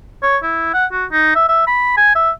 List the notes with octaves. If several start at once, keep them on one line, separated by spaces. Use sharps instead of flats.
C#5
E4
F#5
F#4
D#4
E5
E5
B5
G#5
E5